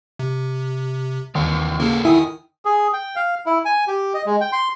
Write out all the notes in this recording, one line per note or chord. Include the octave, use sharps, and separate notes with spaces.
C3
D#2 E3 A#4 C#5
E2 C#3 A#3 A4 A#4
D#3 E4 G#5 D#6
G#4
G5
F5
E4
G#5
G4
D#5
G#3
G5
C6